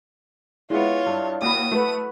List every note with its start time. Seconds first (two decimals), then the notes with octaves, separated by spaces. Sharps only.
0.70 G#3 B3 E4 F4 C#5
1.06 G2
1.42 D#2 F#4 B5 D#6
1.72 A3 F#4 B4